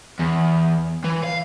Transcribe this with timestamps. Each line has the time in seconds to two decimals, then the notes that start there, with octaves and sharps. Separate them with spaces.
0.19 E2
1.04 E3
1.24 F5